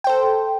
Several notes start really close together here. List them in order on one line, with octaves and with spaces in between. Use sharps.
G5 C5 A4